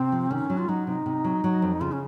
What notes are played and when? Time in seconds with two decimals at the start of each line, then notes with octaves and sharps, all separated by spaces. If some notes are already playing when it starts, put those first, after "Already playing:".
Already playing: C3 C4
0.12 F3
0.30 D#3 C#4
0.50 F#3
0.58 F4
0.68 F#3 D#4
0.87 C3 D#4
1.06 C3
1.24 F#3
1.44 F#3
1.62 F2
1.81 C#3 F4
1.92 C#4